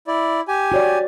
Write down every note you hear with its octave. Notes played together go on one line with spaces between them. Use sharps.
E4 D5
G4 G#5
F#4 C#5 D5